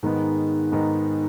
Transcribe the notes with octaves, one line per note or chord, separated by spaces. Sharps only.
G#2 D#3 G#3 B3 D#4
G#2 D#3 G#3 B3